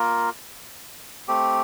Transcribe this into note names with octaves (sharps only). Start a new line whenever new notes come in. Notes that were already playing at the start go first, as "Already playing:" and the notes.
Already playing: A#3 F4 A#4
A3 C4 G4